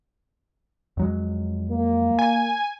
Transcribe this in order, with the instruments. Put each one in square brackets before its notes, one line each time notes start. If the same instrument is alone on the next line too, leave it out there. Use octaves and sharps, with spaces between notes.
[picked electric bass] F2 F#3 G#3
[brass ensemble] A#3
[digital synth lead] G#5